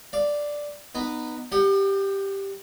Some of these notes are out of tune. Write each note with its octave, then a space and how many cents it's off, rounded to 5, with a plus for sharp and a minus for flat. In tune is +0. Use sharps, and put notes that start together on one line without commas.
D5 +0 F5 -10
B3 +0 D#4 -20
G4 +0 D5 +40 F#5 +5